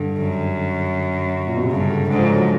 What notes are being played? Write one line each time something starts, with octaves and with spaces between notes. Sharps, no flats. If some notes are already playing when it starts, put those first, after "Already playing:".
Already playing: G2 D3
F#2
A#2
B2
C3
G2 C#3
D3
G#2 D3
F3
F#3